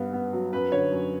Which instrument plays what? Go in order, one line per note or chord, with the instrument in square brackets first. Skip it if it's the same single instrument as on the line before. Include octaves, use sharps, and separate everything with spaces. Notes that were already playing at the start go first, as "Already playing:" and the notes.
Already playing: [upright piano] G2 B3
B3
F#3
F#2 B4
D3 C#5
F#2